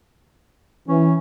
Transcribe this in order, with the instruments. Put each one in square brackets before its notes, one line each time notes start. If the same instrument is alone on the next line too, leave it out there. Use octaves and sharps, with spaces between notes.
[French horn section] E3 [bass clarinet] C#4